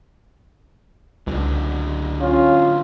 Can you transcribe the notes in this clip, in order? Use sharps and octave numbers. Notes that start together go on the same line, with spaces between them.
C#2 D3 F#3
C#4 F4